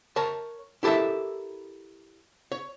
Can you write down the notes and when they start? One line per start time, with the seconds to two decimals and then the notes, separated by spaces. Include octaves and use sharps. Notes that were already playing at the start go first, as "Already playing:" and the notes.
0.16 A#4 C#5 A5
0.83 E4 G4 A4 A#4 E5
2.52 C#5